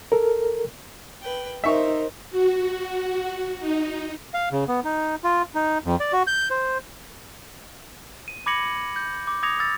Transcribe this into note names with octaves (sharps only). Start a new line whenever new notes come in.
A4 A#4
B4 G5
D#4 A#4 C5 E5 C#6
F#4
D#4
F5
C#3
B3
D#4
F4
D#4
F2
D5
F#4
G6
C5
D#7
B5 D6 G#6 A#6 C#7 F#7
G6
D6
D6 D#6 G#6 A#6 C#7 F7
D#6 E6 A6